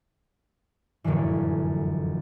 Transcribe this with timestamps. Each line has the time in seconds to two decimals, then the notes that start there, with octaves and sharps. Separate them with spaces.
1.04 F1 F#2 A2 D3 E3